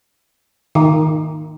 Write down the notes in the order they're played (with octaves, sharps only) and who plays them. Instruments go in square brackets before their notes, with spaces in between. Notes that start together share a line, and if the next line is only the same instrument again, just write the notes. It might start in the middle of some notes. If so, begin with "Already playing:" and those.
[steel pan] D#3